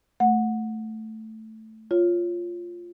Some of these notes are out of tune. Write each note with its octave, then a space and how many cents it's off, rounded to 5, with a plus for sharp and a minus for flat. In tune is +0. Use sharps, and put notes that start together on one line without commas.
A3 +0 F#5 -15
F4 +0 C#5 +0